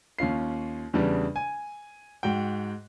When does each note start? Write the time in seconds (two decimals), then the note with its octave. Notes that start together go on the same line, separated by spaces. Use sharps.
0.19 D#2 C#4 F4 C7
0.93 E2 C#3 E3 G3 D4
1.36 G#5
2.23 G#2 F#4 G5